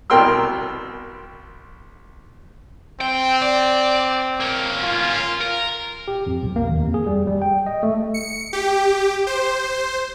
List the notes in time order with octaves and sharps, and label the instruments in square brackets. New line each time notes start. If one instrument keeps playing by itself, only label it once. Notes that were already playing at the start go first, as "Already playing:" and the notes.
[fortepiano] C2 B2 A#4 G5 C6 E6
[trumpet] C4 [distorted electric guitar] G5
[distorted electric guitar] D5
A#3 C#4
[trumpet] F4
[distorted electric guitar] A#4
[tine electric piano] G4
F2
B1
A#3
D#2
F2
G#4
G3
G3
G5
D#5
A3
[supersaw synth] C#7
G4
C5